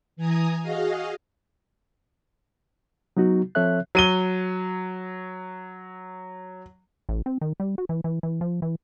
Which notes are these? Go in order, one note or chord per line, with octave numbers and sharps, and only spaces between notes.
E3 G#5 A#5 D#6
F#4 G#4 D#5 F5
F#3 B3 D#4 F#4
F3 C4 A4 C#5 E5 F#6
F#3 D#7 G7
A1
C4
D#3
G3
F#4
E3
E3
E3
F3
E3